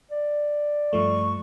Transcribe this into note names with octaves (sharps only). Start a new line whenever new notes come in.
D5
G2 F3 A3 C#6